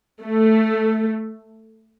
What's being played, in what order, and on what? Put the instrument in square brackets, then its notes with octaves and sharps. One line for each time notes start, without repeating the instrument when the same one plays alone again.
[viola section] A3